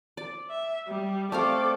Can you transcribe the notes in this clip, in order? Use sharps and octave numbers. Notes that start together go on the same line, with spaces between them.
D5
E5
G3
A3 C4 A4 D5 F5